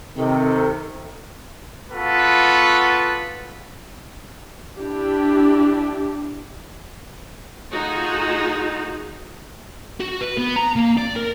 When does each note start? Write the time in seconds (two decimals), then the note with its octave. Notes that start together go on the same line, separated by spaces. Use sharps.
0.17 C3 D#3 A4
1.91 B3 F4 F#4 A4 B4
4.78 D4 E4 G4
7.71 A3 D#4 F4 F#4 G#4
10.00 F#4
10.21 B4
10.38 B3
10.56 A#5
10.76 A#3
10.98 D5
11.16 A#4